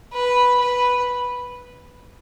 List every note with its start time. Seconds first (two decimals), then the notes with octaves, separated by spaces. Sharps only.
0.13 B4
0.60 B4